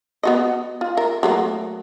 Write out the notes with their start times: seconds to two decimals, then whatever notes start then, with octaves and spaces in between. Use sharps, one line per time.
0.23 B3 F#4 D#5
0.81 F4
0.97 A#4 E5
1.23 F#3 A3 A#3